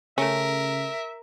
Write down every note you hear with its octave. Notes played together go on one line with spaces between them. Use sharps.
C#3 A3 C#4 A#4 E5